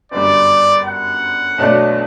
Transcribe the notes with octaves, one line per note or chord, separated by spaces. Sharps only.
G1 F#2 D3 G3 D5
F#5
B1 B2 F#3 A3 D4